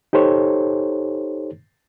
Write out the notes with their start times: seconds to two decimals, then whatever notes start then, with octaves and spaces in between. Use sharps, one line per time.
0.13 D#4 G4 A4 C5 C#5